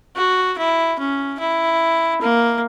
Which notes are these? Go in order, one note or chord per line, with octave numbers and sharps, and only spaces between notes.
F#4
E4
C#4
E4
A#3